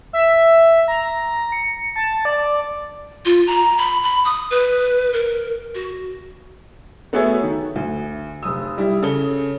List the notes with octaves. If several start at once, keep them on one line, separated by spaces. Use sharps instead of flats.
E5
A#5
C#7
A5
D5
F4
A#5
B5
B5
D#6
B4
A#4
F#4
A3 B3 F#4 G#4 C#5 E5
D#3
D2
F1 D#6 E6
G3 E4
C#3 A4 G7